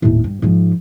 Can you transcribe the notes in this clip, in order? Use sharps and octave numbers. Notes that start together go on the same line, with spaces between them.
D#1 A2
G2
G#2 F3